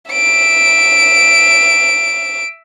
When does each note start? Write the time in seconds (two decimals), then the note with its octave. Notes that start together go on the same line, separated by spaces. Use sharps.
0.12 E5 D7